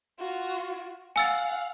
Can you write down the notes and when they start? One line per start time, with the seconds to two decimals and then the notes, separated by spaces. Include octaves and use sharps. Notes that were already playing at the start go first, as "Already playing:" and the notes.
0.19 F4 F#4
1.16 F5 F#5 G#5 E6 A6